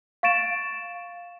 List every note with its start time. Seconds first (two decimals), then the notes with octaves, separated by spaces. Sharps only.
0.23 F5 C#6 A6 D7 E7